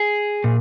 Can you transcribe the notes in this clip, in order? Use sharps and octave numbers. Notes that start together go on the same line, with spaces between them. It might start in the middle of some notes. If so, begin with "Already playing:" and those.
Already playing: G#4
A#2